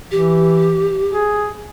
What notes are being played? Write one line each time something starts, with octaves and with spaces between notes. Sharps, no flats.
E3 G4
G#4